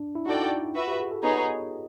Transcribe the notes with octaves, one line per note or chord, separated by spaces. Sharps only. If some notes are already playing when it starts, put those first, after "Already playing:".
Already playing: D4
E4
D#4 F#4 A4 D5 G5
F4 F#4 B4 E5
G4
G#4
A4
B3 D#4 G#4 C#5 D#5